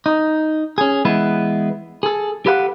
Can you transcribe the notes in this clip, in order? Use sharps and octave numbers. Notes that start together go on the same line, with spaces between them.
D#4
C#4 G#4
E3 G#3 B3 E4 B4
G#4 A4
G4 A4 B4 F5 F#5